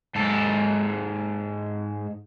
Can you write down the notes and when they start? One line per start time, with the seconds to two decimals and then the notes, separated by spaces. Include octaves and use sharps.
0.15 G#2 A4